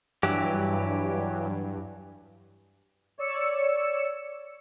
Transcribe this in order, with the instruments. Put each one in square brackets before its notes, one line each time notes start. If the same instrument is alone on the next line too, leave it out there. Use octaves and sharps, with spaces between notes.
[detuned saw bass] G2 [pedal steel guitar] E3 F#3 G4
[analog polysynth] C#5 D5 E6 C#7